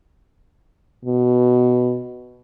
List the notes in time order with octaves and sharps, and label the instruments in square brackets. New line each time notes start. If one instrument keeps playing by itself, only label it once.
[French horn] B2